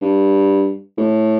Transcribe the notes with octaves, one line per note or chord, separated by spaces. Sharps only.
G2
A2